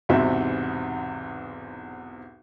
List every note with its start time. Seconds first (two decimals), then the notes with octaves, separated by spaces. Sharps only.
0.09 B1 E2 G#2 C3 E5